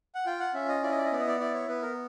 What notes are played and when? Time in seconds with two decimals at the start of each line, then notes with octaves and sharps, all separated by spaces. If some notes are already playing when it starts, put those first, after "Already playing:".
0.15 F#5
0.26 F4 G5
0.40 F#5
0.54 C#4 E5
0.69 D#5
0.83 E4 D5
0.91 D#5
0.98 D5
1.05 D#5
1.12 B3 D5
1.20 D#5
1.27 D5
1.40 E4 D5
1.54 C#5
1.68 B3 B4
1.82 A#4